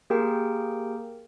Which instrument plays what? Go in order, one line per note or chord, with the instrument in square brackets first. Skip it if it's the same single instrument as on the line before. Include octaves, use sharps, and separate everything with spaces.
[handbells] A#3 G4 G#4 A#4 G5